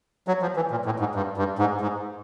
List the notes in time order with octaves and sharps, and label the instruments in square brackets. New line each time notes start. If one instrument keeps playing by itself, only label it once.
[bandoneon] F#3
F3
E3
A#2
A2
G#2
G2
G2
G#2
G#2